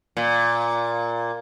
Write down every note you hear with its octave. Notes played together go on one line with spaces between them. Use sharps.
A#2